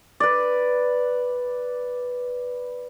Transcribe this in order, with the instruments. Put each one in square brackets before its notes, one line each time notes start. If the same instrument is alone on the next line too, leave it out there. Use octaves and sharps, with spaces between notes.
[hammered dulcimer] B4 D5